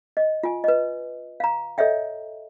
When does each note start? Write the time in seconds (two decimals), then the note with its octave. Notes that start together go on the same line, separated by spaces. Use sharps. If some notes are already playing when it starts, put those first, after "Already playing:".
0.17 D#5
0.43 F4 G#5
0.64 B4 D#5
1.40 F5 A#5
1.78 A4 C#5 D#5 E5 G5